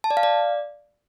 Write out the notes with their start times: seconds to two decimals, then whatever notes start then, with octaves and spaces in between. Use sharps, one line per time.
0.04 A5
0.11 D5
0.17 F5
0.23 D5